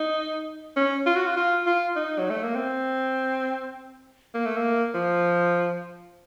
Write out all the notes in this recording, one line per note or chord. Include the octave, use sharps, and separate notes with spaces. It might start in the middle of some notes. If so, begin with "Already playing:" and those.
Already playing: D#4
C#4
F4
F#4
F4
F4
F4
D#4
F#3
A3
A#3
C4
A#3
A3
A#3
F3